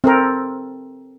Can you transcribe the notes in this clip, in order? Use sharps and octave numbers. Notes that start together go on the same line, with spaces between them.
C4 A4 A#4